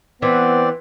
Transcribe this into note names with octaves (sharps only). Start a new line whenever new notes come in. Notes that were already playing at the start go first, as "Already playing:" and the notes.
E3 B3 C4 D5